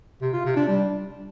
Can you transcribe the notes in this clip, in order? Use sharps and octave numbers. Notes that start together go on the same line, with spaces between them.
C3
F4
C3
D4
G3